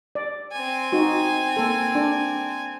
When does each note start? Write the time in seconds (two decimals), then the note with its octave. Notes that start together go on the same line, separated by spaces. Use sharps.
0.15 D5
0.52 C4 G#5
0.92 D#4 F#4
1.57 A#3 A4
1.95 D4